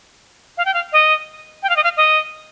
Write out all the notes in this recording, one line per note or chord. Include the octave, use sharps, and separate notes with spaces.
F5
G5
F5
D#5
G5
F5
D#5
F5
D#5